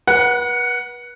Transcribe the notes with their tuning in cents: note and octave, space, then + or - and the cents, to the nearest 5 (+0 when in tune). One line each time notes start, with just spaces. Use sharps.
B4 -35 F#5 +0